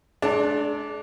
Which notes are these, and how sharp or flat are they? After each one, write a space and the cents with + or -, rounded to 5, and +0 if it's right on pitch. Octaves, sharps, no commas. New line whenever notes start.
G#3 +45 D4 -10 A5 +35